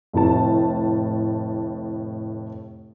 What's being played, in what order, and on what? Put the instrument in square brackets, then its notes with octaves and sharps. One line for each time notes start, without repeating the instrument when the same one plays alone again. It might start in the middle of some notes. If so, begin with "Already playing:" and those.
[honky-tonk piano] F1 A2 A5